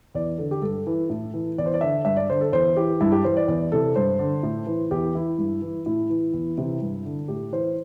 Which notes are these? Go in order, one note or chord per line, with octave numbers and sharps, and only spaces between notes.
E2 D5
D3 A4
G4
G2 A4
E3
A2
E3
E2 D5
C5
D5
D3 E5
G2 E5
D5
D3 C5
A4
E2 C5
E3 G4
G2 E4
G4
E3 C5
D5
E2 D5
C3 E3 A4
G2 C5
D3
A2
E3
E2 G4
E3 E4
G2
E3
A2 E4
E3
E2
C3 E3
G2
D3
A2 G4
E3 C5